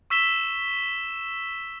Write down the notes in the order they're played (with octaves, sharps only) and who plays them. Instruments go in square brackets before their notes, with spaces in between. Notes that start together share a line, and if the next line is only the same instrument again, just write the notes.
[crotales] C#6 E6 B6 E7 G7